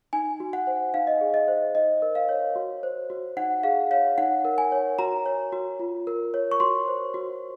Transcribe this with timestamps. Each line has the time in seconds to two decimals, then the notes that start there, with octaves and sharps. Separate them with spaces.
0.13 D#4 G#5
0.40 F#4
0.53 F#5
0.67 C5
0.94 D#4 F5
1.07 D#5
1.21 G#4
1.34 D#5
1.48 C5
1.75 D#4 D#5
2.02 A#4
2.15 F5
2.29 C#5
2.56 F#4
2.83 C5
3.10 F#4
3.37 D#4 F#5
3.63 G#4 F5
3.91 C#5 F5
4.18 D#4 F#5
4.45 A#4
4.58 G#5
4.72 C#5
4.99 F#4 A#5
5.26 C#5
5.53 F#4
5.79 F4
6.07 A#4
6.34 C#5
6.51 C#6
6.60 F#4 C6
6.88 C5
7.14 F#4